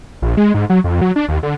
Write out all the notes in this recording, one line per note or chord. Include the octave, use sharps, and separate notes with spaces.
A#1
G#3
G#2
F#3
F2
F#3
D4
D#2
D3